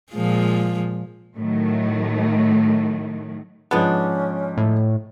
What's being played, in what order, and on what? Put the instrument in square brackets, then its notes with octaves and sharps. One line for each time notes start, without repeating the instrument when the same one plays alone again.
[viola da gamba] A#2 F3 G#3
[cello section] A2 D#3 F#3 A3
[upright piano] G#2 F3 G#4 [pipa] B3 D4 [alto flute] C#4
[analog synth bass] A2